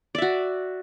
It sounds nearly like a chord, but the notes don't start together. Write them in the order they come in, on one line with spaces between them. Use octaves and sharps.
D5 E5 F#4